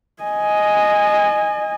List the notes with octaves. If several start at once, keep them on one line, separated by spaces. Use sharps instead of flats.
D#5 G#5